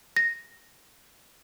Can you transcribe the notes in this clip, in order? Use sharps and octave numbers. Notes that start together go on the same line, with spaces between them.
A#6